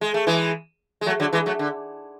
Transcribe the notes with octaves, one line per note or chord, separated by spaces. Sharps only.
G#3
A3
E3 G#3
G#3
F#3 A3
D3 F#3
E3 G#3
F#3 A3
D3